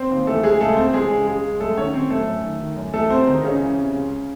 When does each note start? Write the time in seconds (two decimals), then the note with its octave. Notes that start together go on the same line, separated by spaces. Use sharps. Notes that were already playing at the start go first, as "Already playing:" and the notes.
Already playing: C4 C5
0.10 D#2
0.27 E3 A3 A4
0.43 C#3 G#3 G#4
0.60 C#2 A3 A4
0.77 C#2 C4 C5
0.94 E3 G#3 G#4
1.11 C#3
1.27 C#2 G#3 G#4
1.44 C#2
1.60 F#2 A3 A4
1.77 D#3 C#4 C#5
1.94 D#3 C4 C5
2.10 F#2 A3 A4
2.27 F#2
2.44 D#3
2.60 D#3
2.77 F#2
2.94 E3 A3 A4
3.10 C3 C4 C5
3.27 C#2 D#3 D#4
3.44 C#2 C#3 C#4
3.61 E3
3.78 C3
3.94 C#2